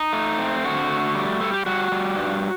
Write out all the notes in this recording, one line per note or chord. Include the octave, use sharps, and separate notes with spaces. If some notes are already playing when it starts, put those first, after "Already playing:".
Already playing: D#4
A3
C4
D3 F#4
A3
G3
G3 A4
G4
G3 F#4
G3
G2